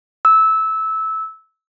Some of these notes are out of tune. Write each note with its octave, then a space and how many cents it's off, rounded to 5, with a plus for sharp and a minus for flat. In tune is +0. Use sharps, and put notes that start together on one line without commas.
E6 -15